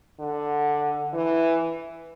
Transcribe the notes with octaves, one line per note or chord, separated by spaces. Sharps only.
D3
E3